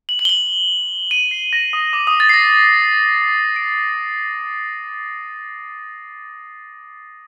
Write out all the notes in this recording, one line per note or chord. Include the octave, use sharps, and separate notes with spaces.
F#7
F#7
G7
F#7
D#7
C7
A#6
D#6
D6
D#6
A6
C7
A#6
D7